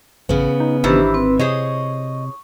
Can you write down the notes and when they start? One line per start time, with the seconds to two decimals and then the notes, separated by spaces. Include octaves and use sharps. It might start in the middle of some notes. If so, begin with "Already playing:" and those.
0.29 A1 C#3 B3
0.60 D#4
0.84 G#1 D#3 E3 D4 E4 G4 C5
1.14 C4 B4
1.39 C3 G#4 C5 C#5 D#5 C#6